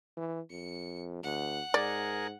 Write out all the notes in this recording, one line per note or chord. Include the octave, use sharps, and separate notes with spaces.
E3
F2 C#7
D2 F#5
G#2 G#4 A#4 D5